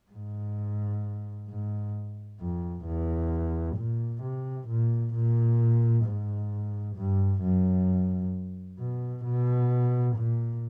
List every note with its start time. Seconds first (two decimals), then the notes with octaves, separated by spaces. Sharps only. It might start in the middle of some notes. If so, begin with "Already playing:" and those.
0.11 G#2
1.48 G#2
2.39 F2
2.85 E2
3.76 A#2
4.22 C3
4.68 A#2
5.14 A#2
6.05 G#2
6.96 G2
7.42 F#2
8.79 B2
9.24 B2
10.16 A#2